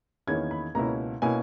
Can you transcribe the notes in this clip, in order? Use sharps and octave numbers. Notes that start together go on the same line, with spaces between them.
E2 D#3 A#3 C#4 E4 G#6
B5
C#2 B2 A#3 C#4 E4 A#5
B2 A#3 C#4 E4 G#5